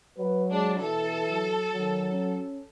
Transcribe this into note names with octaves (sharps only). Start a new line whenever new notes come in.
F#3 B4
G#3 D4
B2 E3 A4
F#3
D#3 F#3
C#4